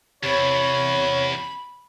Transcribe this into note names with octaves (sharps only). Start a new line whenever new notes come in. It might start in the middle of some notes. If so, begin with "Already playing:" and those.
E2 C3 C#5 B5